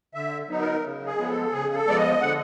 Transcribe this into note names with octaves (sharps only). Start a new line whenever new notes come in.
D3 E5
F#3 B3 D#4
A#4
C#3
G#4
F3 G#3 B3
A4
C#3 G#4
A4
F3 G#3 B3 D5
D#5
D3 F#5